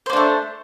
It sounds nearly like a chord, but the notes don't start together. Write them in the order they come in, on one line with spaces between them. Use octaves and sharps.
C5 A#3 D4 A3